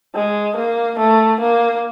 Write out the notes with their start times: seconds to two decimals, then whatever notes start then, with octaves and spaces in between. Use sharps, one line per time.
0.15 G#3
0.56 A#3
0.98 A3
1.40 A#3